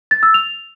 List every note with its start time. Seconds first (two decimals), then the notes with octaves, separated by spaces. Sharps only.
0.11 A6
0.23 E6
0.34 F7